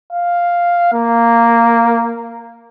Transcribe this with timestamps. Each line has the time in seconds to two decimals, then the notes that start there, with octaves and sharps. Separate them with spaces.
0.13 F5
0.93 A#3